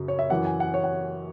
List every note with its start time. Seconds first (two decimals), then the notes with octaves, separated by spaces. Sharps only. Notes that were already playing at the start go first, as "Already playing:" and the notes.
Already playing: F#2 C#3 F#3
0.08 C#5
0.19 E5
0.30 F#2 E3 F#5
0.45 G#5
0.60 F#5
0.74 C#5
0.84 F#5